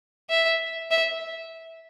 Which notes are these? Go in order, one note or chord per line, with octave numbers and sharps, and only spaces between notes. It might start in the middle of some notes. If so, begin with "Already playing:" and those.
E5
E5